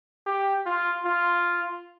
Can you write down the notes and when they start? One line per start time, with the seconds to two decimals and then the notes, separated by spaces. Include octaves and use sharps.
0.26 G4
0.66 F4
1.05 F4